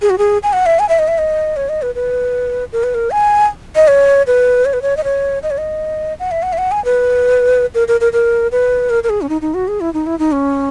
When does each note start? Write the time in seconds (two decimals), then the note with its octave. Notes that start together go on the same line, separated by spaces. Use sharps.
0.02 G#4
0.10 F#4
0.18 G#4
0.43 G#5
0.53 F#5
0.66 E5
0.79 G#5
0.89 E5
0.99 D#5
1.08 E5
1.18 D#5
1.56 C#5
1.69 D#5
1.82 B4
1.95 B4
2.73 A#4
2.83 B4
2.94 A#4
3.11 G#5
3.76 D#5
3.88 C#5
4.27 B4
4.65 C#5
4.73 B4
4.82 C#5
4.97 D#5
5.04 C#5
5.43 D#5
5.51 C#5
5.58 D#5
6.19 F#5
6.31 E5
6.43 F#5
6.53 E5
6.58 F#5
6.71 G#5
6.85 B4
7.75 A#4
7.88 A#4
8.01 A#4
8.13 A#4
8.52 B4
8.90 A#4
9.04 A#4
9.09 G#4
9.22 C#4
9.29 D#4
9.42 D#4
9.54 F#4
9.68 G#4
9.81 E4
9.94 D#4
10.06 E4
10.19 D#4
10.32 C#4